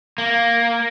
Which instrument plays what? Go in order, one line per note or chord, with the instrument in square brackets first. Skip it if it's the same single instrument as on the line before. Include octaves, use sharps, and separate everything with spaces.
[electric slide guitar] A#3